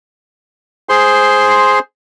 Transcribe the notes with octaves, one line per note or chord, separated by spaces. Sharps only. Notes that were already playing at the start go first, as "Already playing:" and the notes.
G#4 C5 C6